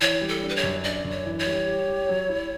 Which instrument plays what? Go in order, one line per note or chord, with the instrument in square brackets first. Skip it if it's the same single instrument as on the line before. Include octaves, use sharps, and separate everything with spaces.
[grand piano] E3 [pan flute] C#5
[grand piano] G3
[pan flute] A4
[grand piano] D4
[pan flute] B4
C#5
[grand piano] F#2
[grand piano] D4 [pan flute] D5
[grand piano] F#2
[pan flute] C#5
[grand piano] E3
[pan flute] C#5
[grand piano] G3
G4
G4
F#3
E4